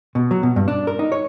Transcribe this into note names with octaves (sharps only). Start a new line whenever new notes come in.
B2
F#3
B2
G2
D4
A#4
D#4
C#5